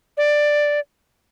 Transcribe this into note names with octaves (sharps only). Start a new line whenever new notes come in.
D5